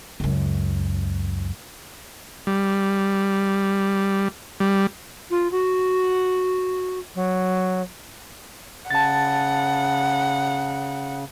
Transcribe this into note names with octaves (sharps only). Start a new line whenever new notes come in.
C#2 F#2
G3
G3
F4
F#4
F#3
C#3 F#5 A5 A6